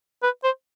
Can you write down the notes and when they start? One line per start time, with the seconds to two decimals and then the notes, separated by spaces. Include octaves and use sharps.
0.23 B4
0.44 C5